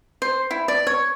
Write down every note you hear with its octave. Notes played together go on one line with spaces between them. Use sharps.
C5
E4
D5
C#5